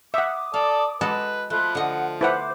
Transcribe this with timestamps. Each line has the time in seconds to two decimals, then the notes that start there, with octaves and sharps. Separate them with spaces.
0.14 E5 F#5 D6 D#6
0.54 A4 D5 F5
1.01 G#3 F#4 A4 B4
1.50 F3 A3 B5 C6 F#6
1.75 D3 D#5 F#5
2.21 E4 B4 C5 F#5 D6